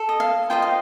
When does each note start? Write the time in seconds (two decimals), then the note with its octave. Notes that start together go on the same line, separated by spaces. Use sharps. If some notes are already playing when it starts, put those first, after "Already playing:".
Already playing: A4
0.09 D#5
0.20 F5
0.50 F4 C5 D#5 G5
0.62 F5